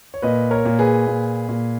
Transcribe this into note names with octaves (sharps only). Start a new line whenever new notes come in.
C#5
A#2 B4 D#5
A#4 C#5
A#2
G#4 B4
A#2
A#2